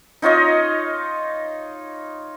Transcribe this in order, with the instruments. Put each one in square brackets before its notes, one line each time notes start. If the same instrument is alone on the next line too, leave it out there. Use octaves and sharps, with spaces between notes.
[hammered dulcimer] D#4 F4 C#5 D#5